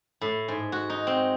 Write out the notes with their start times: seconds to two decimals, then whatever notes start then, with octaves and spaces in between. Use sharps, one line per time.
0.21 A2
0.48 G#2
0.72 F#4
0.90 D#4
1.07 C4